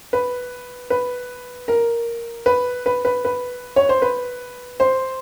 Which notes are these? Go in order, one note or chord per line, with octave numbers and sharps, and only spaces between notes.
B4
B4
A#4
B4
B4
B4
B4
C#5
C5
B4
C5